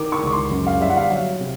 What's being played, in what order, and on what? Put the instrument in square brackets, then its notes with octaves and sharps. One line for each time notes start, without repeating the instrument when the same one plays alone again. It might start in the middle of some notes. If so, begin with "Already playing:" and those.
Already playing: [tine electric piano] D#3 [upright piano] D6
[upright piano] C#6
[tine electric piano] C#2 [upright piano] C#6
[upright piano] C6
[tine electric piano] F#2
[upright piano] F5
[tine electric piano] G3 [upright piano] E5
[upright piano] F#5
F5
[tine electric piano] F#3 [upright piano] F5
[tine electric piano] C3